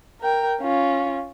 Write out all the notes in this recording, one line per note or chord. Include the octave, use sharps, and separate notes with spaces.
A#4 G5
C#4 F4